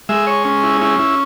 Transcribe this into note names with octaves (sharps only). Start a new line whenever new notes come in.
G#3 E5
C#5
C#4
E4
C#4 E4
E4